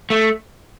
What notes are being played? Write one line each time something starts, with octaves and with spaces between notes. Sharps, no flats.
A3